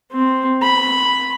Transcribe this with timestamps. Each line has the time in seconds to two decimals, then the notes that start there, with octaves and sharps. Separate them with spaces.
0.12 C4
0.63 B5